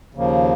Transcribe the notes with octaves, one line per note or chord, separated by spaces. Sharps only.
D#2 C#3 F3 A#3